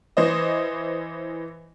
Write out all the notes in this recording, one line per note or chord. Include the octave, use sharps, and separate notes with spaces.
E3 C5 D#5